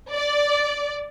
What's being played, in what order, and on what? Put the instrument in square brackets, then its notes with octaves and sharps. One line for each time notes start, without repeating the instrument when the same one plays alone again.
[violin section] D5